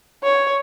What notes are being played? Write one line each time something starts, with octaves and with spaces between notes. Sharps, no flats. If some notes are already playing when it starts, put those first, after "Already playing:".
C#5